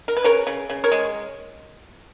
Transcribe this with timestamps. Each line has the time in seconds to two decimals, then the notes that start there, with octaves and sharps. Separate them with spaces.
0.08 A#4
0.17 B4
0.24 C#3 A#4 C#5
0.47 C#3
0.70 C#3
0.84 A#4 C#5
0.92 G#3